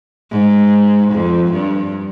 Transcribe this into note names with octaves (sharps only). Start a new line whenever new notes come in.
G#2
F2
G2